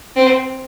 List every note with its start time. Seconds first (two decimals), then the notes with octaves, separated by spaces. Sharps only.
0.16 C4